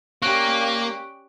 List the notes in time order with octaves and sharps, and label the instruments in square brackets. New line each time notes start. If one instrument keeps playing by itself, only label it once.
[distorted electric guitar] A#3 [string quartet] C#4 G4 D5 [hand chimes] C#6 F#6 D7